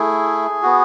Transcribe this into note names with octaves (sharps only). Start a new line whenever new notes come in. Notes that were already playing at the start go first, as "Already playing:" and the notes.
Already playing: A3 E4 G#4
B3 F#4